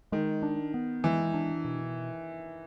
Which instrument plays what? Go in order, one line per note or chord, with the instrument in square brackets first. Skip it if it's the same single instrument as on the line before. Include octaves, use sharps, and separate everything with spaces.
[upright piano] D#3 [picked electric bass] G#3
[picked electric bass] D4
B3
[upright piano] E3 [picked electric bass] G#3
[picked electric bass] D4
B2